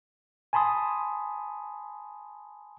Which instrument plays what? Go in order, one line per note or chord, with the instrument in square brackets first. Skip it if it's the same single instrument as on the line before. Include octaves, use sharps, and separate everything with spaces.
[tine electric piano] G#5 A5 B5 C6 D#6